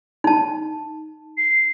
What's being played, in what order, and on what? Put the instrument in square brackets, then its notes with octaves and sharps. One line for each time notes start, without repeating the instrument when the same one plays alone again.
[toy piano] D#4 A5
[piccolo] C7